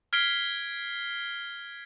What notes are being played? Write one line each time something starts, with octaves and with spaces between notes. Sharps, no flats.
F6 G#6 B6 C7 D7 G7